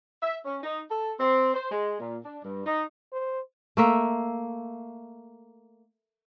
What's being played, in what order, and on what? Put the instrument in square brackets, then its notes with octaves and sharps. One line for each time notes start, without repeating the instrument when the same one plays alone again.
[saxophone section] E5
C#4
D#4
A4
C4
C5
G#3
A#2
D4
G2
D#4
[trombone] C5
[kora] A3 A#3 E5